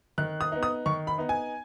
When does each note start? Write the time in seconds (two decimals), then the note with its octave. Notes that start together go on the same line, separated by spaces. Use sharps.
0.18 D#3 F#6
0.41 D#6
0.52 B3 D#4
0.63 D#6
0.86 D#3 C#6
1.07 B5
1.18 B3 D#4
1.29 G#5